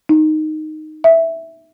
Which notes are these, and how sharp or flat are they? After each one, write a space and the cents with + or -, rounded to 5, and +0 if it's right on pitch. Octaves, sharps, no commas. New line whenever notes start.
D#4 -5
E5 +0